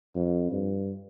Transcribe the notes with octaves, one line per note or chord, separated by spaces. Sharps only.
F2
G2